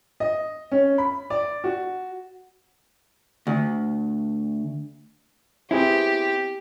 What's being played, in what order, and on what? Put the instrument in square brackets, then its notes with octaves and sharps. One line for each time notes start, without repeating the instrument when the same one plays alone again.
[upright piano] D#5
C#4
B5
D5
F#4
[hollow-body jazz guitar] D2
[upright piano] B3 C4 G#4 [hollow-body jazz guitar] E4 [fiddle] G4